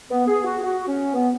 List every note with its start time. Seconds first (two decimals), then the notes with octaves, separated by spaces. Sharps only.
0.10 B3
0.28 G#4
0.45 F#4
0.62 F#4
0.88 C#4
1.14 B3